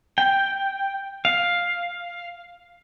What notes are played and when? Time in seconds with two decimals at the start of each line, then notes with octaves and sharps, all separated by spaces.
0.18 G5
1.25 F5